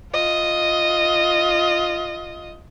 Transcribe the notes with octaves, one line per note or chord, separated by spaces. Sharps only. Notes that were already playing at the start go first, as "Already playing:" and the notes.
F4 D#5